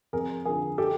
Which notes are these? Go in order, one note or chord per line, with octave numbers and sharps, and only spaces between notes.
F2 G#4 A#4
D3 F3 G#4 A#4
G4 A4